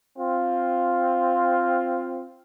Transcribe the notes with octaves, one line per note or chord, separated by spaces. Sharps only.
C4 F4